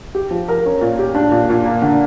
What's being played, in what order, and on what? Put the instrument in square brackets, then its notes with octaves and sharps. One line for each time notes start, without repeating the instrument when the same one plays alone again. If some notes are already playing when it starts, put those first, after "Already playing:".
[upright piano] G4
F3
A#4
C#4
A#2
G4
D4
A#2
A#2
A#3
D3